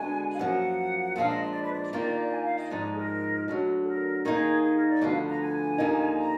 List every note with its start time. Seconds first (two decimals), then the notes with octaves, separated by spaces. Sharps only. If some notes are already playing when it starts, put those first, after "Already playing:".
Already playing: D3 G#3 B3 D4 F#4 G#5
0.33 F5
0.38 F#2 F3 A#3 F#5
1.16 A#2 F3 G#3 D4 F5
1.29 D#5
1.42 D#5
1.51 D5
1.62 B4
1.73 D5
1.93 D#3 A#3 F4
2.31 G#5
2.44 F5
2.58 D#5
2.70 G#2 F3 G#3 D#4 D5
2.83 D5
2.92 G#4
2.96 A#4
3.48 D2 D3 F#3
3.82 G#4
3.87 A#4
4.24 D#3 A#3 D#4 G#4
4.63 G#4
4.77 A#4
4.89 D5
5.02 D2 D3 F3 B3 F5
5.28 A#5
5.41 G#5
5.78 D#2 D3 F3 A#3 D#4
6.18 A#5